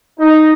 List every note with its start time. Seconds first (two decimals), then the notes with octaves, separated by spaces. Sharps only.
0.19 D#4